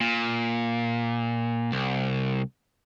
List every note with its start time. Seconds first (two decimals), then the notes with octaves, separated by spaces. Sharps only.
0.01 A#2
1.72 C2